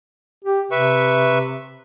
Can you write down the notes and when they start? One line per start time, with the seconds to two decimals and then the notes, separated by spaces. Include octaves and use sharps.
0.45 G4
0.71 C3 B4 E5 C#6